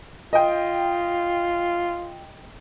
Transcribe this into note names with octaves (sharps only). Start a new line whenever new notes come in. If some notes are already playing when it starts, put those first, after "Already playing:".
F4 D#5 G5